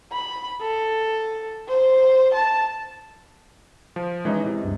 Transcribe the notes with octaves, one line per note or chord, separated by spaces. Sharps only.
B5
A4
C5
A5
F3
E3 G#3 C#4 D#4 E4 D#5
C3
C#2 G2